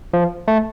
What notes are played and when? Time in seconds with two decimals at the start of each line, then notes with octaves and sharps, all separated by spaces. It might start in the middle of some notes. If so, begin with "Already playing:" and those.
0.13 F3
0.48 A3